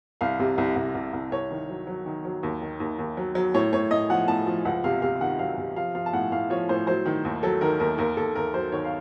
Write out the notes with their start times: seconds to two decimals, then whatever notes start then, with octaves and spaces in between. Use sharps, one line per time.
0.21 C2 F5
0.39 C3
0.58 C2
0.76 C2
0.95 C2
1.13 C2
1.32 C2 C#5
1.51 D#3
1.69 F#3
1.87 F#3
2.06 D#3
2.25 F#3
2.43 D#2
2.62 D#3
2.80 D#2
2.99 D#2
3.17 F#3
3.35 F#3
3.54 A2 C#5
3.73 A2 C#5
3.91 A2 D#5
4.10 F3 F#5
4.28 A2 A5
4.47 F3
4.65 C#2 F#5
4.84 C3 F5
5.02 C3 F5
5.21 D#3 F#5
5.39 F#3 F5
5.58 C3
5.76 F3 F5
5.95 F3 F5
6.06 A5
6.13 A2 F#5
6.32 A2 F5
6.50 F3 C#5
6.69 A2 C5
6.87 F#3 C5
7.06 D#3
7.25 D#2
7.43 F#3 A4
7.61 D#3 A#4
7.80 D#2 A#4
7.98 D#2 A#4
8.17 D#2 A4
8.35 D#2 A#4
8.54 F#3 C5
8.72 D#3 C#5
8.84 F5